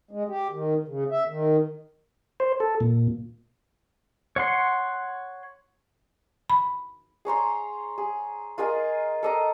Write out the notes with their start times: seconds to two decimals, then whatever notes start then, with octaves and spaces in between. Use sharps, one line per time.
0.11 G#3
0.29 G4
0.51 D#3
0.88 C#3
1.11 E5
1.28 D#3
2.40 C5
2.60 A4
2.80 A#2
4.36 C#5 F#5 C6
6.50 B5
7.25 G#4 C#5 A#5 C6
7.98 G#4
8.58 F4 G#4 A#4 D#5
9.23 A4 D#5 A#5